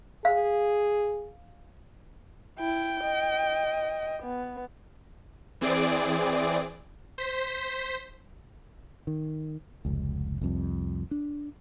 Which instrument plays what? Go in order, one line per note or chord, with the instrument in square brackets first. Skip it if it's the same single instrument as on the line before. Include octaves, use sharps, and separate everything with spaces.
[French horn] G#4 [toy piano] F5
[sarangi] E4 [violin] G5
[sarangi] D#5
B3
[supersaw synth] E3 C4 G#4 D5 D7
C5 B6
[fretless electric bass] D#3
F1 C#2
C2 F2
D4